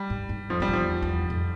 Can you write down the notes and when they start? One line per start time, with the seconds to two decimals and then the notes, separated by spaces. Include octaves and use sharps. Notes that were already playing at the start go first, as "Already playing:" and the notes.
Already playing: G3
0.10 G2
0.29 G2
0.49 F2 F3
0.60 G2 G3
0.68 F2
0.73 E2 F3
1.02 E2
1.30 F2